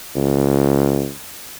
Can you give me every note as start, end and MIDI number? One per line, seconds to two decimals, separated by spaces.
0.16 1.10 37